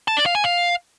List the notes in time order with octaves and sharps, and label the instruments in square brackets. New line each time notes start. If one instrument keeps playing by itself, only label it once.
[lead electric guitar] A5
D5
F5
G#5
F5